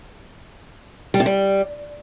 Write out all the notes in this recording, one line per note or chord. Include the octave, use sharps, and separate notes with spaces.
G3
C3
G3